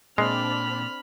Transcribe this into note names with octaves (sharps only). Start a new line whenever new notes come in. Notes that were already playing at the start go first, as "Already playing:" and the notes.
A#2 G#3 C4 D4 B5 F6